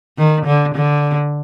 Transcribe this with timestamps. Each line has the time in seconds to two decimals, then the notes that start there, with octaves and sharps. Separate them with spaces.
0.18 D#3
0.46 D3
0.75 D3